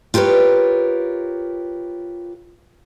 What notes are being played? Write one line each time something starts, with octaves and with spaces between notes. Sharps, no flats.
F4 G4 A#4 B4 C#5